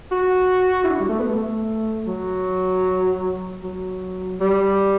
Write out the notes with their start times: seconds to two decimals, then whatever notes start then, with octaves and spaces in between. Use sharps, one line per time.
0.11 F#4
0.84 E4
0.90 D4
1.00 G3
1.09 A3
1.19 B3
1.29 A3
2.07 F#3
3.63 F#3
4.41 G3